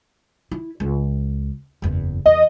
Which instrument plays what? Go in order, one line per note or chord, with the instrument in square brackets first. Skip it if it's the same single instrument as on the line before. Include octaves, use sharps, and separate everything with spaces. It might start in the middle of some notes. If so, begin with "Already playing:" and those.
[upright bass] E4
C#2
F#1 E2
[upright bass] E2 [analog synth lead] D#5